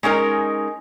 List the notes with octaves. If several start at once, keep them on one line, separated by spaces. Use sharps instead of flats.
G#3 C#4 D#4 A#4